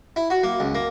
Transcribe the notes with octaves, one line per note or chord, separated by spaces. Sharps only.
E4
F#4
A#3
C#2
A#3